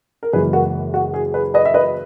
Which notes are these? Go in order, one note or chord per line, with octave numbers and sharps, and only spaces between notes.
A#4
F#1 F#2 E3 G#3 G#4 B4
F#4 A#4
F#4
G#4
G#4 B4
B4 D#5
E5
B4 D#5